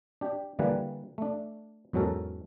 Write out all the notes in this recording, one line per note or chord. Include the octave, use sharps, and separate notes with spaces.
D4 G4
D3 E3 G3 A#3 F#5 G#5
A3 D4
E2 G#2 F#3 C#4 A4 A#4